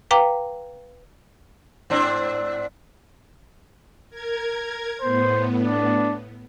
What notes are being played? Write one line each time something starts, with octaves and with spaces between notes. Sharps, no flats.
B4 F5 G5 A#5 D6
G#2 C4 D4
A#4 G#6
A2 B3 C5
D4